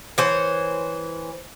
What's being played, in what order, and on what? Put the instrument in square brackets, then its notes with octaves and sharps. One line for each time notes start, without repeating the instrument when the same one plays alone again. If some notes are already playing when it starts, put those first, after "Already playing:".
[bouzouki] E3 C5 C#5